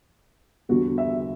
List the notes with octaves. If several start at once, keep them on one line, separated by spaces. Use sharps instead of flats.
E2 D3 G3 F#4
E5